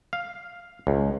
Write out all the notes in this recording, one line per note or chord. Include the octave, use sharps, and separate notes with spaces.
F5
C#2